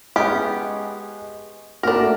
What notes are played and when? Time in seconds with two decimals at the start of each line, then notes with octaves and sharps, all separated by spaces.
0.16 G#3 B3 C#4 G4
1.83 A3 A#3 D4 F#4 A#4